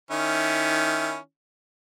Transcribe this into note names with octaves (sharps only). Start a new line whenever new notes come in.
D#3 C#4 E4